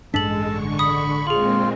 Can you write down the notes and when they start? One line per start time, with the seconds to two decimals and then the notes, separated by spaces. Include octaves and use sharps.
0.14 A1 G2 G#3 D4 A4 A5 B6 F#7
0.47 D3 C#6
0.79 B5 D#6
1.27 A#2 G#3 C4 F4 G#4 F#7